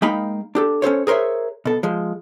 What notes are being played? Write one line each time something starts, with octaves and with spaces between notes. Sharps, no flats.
G#3 A#3 D#4 F5 G5 B5
D4 G4 A4
C#4 A4 C5 C#5
G#4 A#4 C5 C#5 E5
B2 A4
F3 G#3